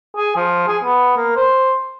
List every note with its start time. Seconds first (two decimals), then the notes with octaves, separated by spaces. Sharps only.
0.16 G#4
0.36 F3
0.68 G#4
0.84 B3
1.16 A#3
1.36 C5